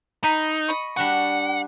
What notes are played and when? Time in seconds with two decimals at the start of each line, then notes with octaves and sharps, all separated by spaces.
0.24 D#4 A#5 B5
0.68 D#5 B5 C#6
0.97 G3 D4 F#4 F#5